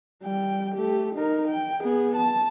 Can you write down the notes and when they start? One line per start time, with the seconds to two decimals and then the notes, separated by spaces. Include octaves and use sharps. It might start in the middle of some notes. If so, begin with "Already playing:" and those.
0.23 G3 G5
0.75 A3 G4
1.15 D#4 A#4
1.48 G5
1.81 B3 G#4
2.16 A5